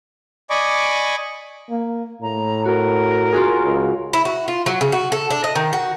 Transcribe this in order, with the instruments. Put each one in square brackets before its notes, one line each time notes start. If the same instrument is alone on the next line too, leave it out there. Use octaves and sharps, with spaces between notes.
[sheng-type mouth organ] D5 D#5 G#5 B5 C#6 D6
[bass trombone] A#3
[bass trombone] A2 [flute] A#5
[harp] F#4 [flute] A#4
[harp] F4 F#4 G#4
[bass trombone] C#2
[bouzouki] E4
F#4
F4
F#3
C#3
F#4
A4
D4
D#5
D#3
F#4